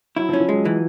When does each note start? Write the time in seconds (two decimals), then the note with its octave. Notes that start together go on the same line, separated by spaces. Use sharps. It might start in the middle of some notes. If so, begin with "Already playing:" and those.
0.16 F#3 E4
0.29 F3
0.33 C#4
0.40 F3
0.49 F#3 G#3
0.65 E3 F#3